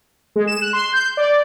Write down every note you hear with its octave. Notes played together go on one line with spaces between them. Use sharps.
G#3
E7
F#6
C6
G6
D5